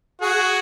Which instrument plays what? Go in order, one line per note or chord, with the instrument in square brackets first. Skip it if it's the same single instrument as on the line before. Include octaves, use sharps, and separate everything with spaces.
[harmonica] F#4 G#4